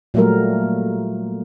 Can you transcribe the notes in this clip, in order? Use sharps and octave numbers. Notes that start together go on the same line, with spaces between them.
A#2 F#3 G3 A3 A#3 A#4